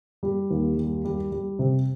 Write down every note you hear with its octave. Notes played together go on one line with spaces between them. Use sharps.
G3
D#2
G3
G3
G3
C3